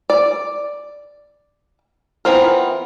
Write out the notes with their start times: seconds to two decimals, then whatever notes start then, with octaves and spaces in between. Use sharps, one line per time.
0.10 D5
2.25 E3 B3 C4 F4 A#4